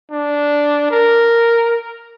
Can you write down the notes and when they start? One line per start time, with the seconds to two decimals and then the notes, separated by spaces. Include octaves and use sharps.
0.12 D4
0.91 A#4